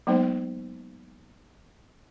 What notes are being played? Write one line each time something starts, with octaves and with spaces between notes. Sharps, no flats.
F#3 G#3 A#3 B3 D#4 C5